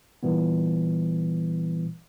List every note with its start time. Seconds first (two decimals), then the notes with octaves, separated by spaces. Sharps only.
0.23 A#2 E3 G3 B3